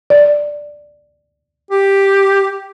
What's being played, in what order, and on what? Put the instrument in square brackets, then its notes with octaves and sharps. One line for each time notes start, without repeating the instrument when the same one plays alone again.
[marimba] D5
[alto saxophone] G4